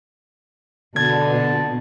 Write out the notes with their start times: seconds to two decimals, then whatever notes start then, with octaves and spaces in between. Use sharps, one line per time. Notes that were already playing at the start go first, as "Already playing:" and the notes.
0.96 B2 D3 A5 G#6